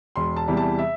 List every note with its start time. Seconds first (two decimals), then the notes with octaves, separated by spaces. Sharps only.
0.16 E1 C6
0.36 A5
0.48 E2 C3 E3 G3
0.57 A5
0.78 E5